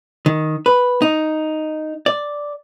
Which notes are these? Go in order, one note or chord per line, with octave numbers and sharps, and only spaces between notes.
D#3
B4
D#4
D5